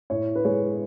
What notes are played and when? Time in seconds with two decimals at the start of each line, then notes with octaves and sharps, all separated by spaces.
0.10 A2 C#5
0.35 B4
0.45 G#3 C#5